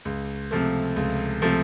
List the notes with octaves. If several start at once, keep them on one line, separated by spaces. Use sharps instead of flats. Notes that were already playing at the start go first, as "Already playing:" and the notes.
C#2
C3 F3 A3
C#2
C3 F3 A3